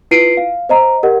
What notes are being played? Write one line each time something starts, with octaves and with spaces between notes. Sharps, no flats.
E4 F4 B4 C7 D7 D#7
F5
C5 D#5 A#5
G4 A#4 D#5 F#5